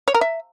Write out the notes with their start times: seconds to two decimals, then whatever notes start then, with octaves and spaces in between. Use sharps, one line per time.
0.08 C#5
0.14 A#4
0.21 E5